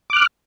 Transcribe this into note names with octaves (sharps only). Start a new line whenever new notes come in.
D6 F6 F#6